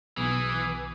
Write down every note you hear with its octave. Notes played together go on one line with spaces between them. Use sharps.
B1 B2 E3 G#4